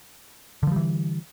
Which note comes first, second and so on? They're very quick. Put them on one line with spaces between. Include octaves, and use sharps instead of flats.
D3 F3 G3 E3